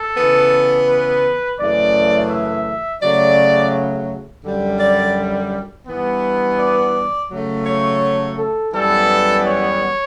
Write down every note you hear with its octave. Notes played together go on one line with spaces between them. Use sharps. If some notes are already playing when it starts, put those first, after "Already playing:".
Already playing: A4
C#3 E3 B3
B4
F#2 C#3 E3 A3 D5
E5
C#3 F#3 A3 D5
F#2 D3 G3
D5
G2 E3 B3
D5
C#3 F#3 A3
C#5
A4
F#2 E3 G3 B3 A4
C#5